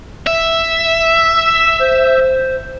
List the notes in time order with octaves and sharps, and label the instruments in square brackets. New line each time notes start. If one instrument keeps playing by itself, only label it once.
[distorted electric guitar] E5
[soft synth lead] C5